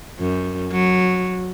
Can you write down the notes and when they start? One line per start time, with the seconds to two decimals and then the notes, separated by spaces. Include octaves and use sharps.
0.19 F#2
0.72 F#3